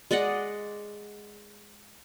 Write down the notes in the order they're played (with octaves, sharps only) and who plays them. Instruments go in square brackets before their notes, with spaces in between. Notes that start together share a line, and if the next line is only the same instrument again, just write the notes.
[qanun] G#3 D5 D#5 F#5